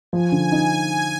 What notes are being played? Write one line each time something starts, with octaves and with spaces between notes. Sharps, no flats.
F3 G#5
D3
D#4